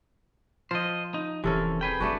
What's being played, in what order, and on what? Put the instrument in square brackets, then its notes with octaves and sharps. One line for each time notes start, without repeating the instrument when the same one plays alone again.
[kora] F3 [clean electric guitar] C5 D#5
[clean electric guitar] D#4
[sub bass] E1 [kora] C3 A4 A#4 [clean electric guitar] E3 C#4
[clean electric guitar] G#4 B4 G5
[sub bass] F#1 [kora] A3 D4 F#4